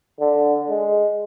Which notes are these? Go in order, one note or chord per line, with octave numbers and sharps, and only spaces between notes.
D3
G#3